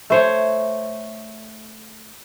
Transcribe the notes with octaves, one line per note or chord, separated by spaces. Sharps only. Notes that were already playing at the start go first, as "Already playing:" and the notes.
A3 C5 C#5